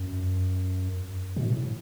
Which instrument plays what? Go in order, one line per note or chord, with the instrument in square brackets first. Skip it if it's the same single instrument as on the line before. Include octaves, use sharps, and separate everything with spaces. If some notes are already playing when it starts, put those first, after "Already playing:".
Already playing: [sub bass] F#2
B2
A2